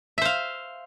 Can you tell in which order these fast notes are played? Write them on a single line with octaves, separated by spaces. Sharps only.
E5 C5 F5